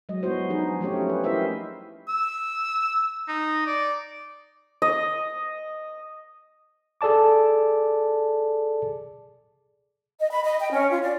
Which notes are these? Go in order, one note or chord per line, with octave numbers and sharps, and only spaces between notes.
F#3 G#3 D#5
G3 B3 E4 F#4 C5
F3 D4 D#4 G#4
F3 A3 C#4 G4 C#5
B3 B4
E4 G4 A#4 C5 D#5 E5
E6
D#4
D5
D#5
G#4 A4 D5 A5 D6
D#5
B5
D#5
G5
C#4
F4
D5